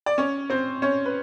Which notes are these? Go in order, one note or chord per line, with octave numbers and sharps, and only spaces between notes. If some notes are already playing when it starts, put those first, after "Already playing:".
D5
C#4 C#5
C4 C5
C#4 C#5
B4